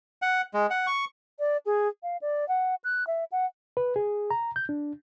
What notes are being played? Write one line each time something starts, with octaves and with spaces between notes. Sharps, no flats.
F#5
G#3
F#5
C#6
D5
G#4
F5
D5
F#5
F#6
E5
F#5
B4
G#4
A#5
G6
D4